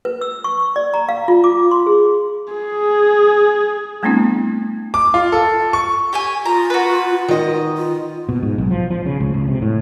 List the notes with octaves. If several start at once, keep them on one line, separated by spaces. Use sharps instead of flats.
B4
E6
C#6
D5
A#5
F5
F4
D6
C6
G#4
G#4
G3 A3 B3 C4 D4 E4
D6
F4
A4
C#6
G4 C#5 G#5
F4 A#5
F#4 B4
D#3 D#5
F4
B2
G#2
B1
F3
F3
C#3
C#2
C#2
C3
A2